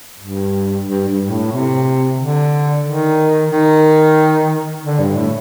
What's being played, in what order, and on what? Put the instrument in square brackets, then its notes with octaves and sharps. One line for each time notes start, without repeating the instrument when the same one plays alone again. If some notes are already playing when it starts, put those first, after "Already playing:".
[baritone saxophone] G2
G2
G2
A2
C3
D3
D#3
D#3
D3
G2
A2